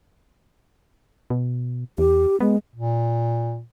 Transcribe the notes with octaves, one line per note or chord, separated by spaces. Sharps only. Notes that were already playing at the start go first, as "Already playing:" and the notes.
B2
E2 G4
G#3 B3
A#2